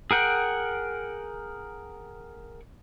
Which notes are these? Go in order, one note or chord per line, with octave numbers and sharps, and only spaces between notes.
G#4 A#4 F#5 G5